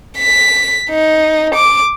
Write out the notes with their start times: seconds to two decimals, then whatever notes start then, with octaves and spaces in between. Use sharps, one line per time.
0.18 B6
0.90 D#4
1.55 D6